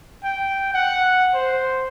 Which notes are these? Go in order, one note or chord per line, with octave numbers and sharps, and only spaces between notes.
G5
F#5
C5